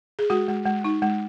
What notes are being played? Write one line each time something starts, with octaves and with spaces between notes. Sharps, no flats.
G#4
G#3 F#4
G#3
G#3
D#4
G#3